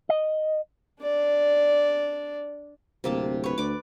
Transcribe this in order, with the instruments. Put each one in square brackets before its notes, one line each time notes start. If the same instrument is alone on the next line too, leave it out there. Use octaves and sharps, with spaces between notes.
[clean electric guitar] D#5
[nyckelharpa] D4 D5
[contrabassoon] D1 [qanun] C3 A#3 A5
[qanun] B4 C#5
[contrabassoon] D2 [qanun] D5 D6